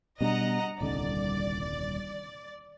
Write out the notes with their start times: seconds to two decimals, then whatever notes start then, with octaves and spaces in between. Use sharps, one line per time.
0.21 B2 G3 D4 D#5 F#5 A#5
0.81 D#1 C2 D3 D5